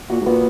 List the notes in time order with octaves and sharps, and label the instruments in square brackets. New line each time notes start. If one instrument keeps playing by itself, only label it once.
[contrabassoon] A#2 [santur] F#4
[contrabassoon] G#2
[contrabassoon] A#2 [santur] B3